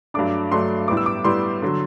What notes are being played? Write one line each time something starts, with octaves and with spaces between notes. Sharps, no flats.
G2 F#3 A3 D4 D6
G2 F#3 A3 D4 C6
A2 G3 B3 D6
E6
D6
A2 G3 B3 C6
D3 F#3